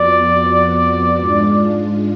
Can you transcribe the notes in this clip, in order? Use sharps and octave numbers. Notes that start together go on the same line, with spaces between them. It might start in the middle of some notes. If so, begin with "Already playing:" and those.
Already playing: F2 F3 B3 F#4 D5
G#2 G#3 D4 F4